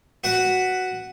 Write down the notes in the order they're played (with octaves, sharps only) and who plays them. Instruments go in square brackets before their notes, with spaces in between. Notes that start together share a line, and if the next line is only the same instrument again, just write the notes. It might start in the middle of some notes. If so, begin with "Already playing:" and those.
[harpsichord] F#4 B4 F#5